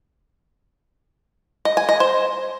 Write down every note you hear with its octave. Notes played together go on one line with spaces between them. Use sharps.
D#5
G#5
D#5
C5